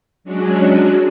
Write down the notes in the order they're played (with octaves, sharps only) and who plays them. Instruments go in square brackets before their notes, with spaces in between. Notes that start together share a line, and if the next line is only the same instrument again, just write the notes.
[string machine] F#3 G#3 C#4 D4 F#4